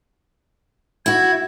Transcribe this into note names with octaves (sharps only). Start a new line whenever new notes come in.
E4 F#4 G#6